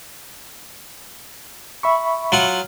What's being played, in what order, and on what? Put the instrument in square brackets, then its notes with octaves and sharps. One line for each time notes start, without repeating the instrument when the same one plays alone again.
[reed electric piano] E5 B5 C#6
[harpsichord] F#3 F4 F#5